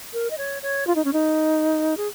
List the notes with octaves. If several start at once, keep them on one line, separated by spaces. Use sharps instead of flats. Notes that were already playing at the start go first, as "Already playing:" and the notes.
A#4
D#5
C#5
C#5
F4
D#4
C#4
D#4
G#4